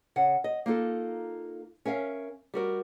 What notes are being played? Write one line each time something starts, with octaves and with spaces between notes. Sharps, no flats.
C#3 F#5
D#5
A#3 D#4 F4 A4
C#4 A#4 E5 F5
G3 F#4 A#4